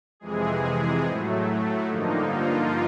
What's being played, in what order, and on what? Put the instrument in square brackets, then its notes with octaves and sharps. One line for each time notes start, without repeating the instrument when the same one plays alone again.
[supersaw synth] F2 C3 E3 G#3 G#4
A2 F#3 A3
G2 D3 F3 A#3 D#4
F3 F4